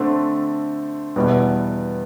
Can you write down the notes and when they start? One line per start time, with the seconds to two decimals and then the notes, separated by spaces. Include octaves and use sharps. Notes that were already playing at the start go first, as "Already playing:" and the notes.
Already playing: D3 A3 C4
1.16 E2 B2 G3 B3 E4